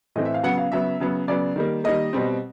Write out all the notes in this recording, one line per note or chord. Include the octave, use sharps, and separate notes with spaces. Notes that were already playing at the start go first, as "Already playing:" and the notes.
A2 E3 A3 C4 D#5
E5
F5
C#3 F#3 B3 F#5
F5
C#3 F#3 B3 E5
C#3 F#3 B3
C#3 F#3 B3 D5
D#3 G3 A#3
D#3 G3 A#3 D#5
B2 G3 C4